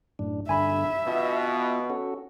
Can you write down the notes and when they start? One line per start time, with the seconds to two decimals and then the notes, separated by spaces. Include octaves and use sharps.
0.19 F#2 A2 D4
0.49 G2 D3 E5 G#5 B5
1.07 B2 B3 F4
1.90 C#4 F#4 A4